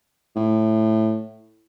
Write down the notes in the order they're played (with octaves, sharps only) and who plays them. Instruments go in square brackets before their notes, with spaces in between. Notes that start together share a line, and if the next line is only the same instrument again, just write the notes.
[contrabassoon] A2